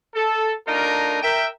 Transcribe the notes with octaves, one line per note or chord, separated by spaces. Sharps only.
A4
A3 D4 D#4 F4 A#4
A#4 E5 G5